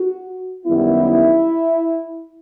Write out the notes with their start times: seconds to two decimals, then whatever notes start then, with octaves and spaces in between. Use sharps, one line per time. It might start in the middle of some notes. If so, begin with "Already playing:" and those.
Already playing: F#4
0.66 F#2 D#3 G3 B3 E4